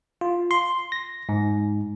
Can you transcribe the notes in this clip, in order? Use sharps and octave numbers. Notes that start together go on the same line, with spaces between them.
F4
C6
A#6
G#2